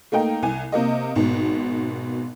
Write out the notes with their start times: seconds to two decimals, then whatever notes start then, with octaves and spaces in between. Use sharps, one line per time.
0.12 A3 A#3 D#4 G5
0.43 C2 G#5
0.72 C3 A#3 D#5
1.15 G#1 G#2 B2